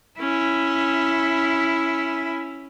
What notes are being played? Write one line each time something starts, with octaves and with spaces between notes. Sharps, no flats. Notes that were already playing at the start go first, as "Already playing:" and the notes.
C#4 E4